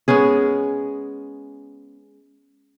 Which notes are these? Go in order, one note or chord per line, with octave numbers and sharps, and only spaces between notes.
G#3 B3 C#4 G#4